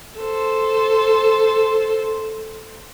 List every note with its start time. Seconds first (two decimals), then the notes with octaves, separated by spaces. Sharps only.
0.19 A4 C5